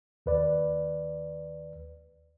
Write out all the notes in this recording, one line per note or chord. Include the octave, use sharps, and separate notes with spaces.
D#2 B4 D5